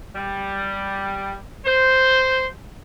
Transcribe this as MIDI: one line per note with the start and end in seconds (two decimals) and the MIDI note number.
0.16 1.36 55
1.66 2.47 72